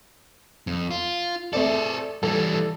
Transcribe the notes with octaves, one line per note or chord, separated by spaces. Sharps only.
F2
F4
A3 C4 G#4 A4 D5
E3 G3 A4